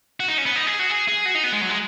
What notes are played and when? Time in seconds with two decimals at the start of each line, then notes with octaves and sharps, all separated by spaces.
0.20 F#4
0.28 D#4
0.38 C#4
0.46 B3
0.56 D#4
0.67 G#4
0.79 F#4
0.90 G#4
1.08 G#4
1.26 F#4
1.35 D#4
1.44 B3
1.53 G#3
1.61 F#3
1.70 G#3